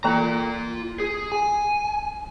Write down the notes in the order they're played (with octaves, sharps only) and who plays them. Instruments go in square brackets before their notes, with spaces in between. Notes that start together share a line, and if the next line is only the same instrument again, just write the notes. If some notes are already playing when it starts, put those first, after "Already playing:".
[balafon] E3 A#3 A4 [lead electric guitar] F4 A#5
[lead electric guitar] G#4
G#5